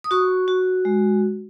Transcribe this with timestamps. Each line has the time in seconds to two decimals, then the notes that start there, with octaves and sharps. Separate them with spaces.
0.04 D#6
0.11 F#4 C#6
0.48 F#4
0.85 G#3